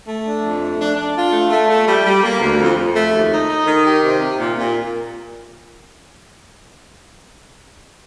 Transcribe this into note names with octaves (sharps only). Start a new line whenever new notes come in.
A3
D4
F2
A3
D4
D4
F4
A3
A3
A3
G3
G3
A#3
D2
F2
F2
A3
D#2
D#4
D#4
D#3
G4
C3
C3
A#2
A#2